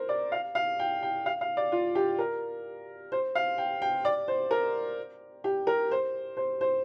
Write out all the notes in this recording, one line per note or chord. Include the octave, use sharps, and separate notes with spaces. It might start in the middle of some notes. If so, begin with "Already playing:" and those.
Already playing: A#4 C5
D5
F5
F5
G5
G5
F5
F5
D5
F4
G4
A#4
C5
F5
G5
G5
D5
C5
A#4
G4
A#4
C5
C5
C5